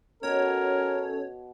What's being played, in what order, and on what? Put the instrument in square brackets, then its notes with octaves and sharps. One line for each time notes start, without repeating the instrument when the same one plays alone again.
[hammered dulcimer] B2 [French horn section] C#4 A4 [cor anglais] A#4 [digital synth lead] C#5